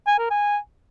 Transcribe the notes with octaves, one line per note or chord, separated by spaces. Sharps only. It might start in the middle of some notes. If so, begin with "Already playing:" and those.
G#5
A#4
G#5